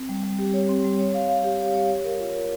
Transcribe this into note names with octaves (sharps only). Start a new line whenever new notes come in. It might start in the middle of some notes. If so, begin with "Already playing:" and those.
Already playing: C4
G3
G3
G4
C#5
C4
G3
C#5
F5
F5
G4
C#5
C#5
C#5
A#4
F4
F4